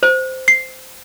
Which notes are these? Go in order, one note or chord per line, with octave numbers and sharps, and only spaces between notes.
C5
C7